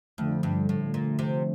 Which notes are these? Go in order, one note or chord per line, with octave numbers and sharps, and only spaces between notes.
F2 D3 F3 A3
G2
A2
A#2
C3